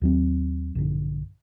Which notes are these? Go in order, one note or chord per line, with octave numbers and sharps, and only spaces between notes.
D#2 F#3 C4
A#1 G2 D3